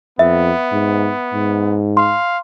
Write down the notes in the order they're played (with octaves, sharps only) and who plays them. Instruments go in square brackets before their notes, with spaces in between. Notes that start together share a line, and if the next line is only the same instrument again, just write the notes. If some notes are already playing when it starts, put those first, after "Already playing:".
[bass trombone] F2 [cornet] B3 [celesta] E5
[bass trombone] G#2
G#2
[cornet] F5 [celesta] C6